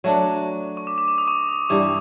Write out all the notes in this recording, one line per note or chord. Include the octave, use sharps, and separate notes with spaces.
F#3 A3 D4 C#6
C#6
D6
D6
D6
D#6
C#6
D6
G2 E3 G3 D6